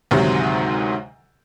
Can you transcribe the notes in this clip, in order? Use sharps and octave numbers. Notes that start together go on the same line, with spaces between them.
D2 G#2 C3 D#3 F#3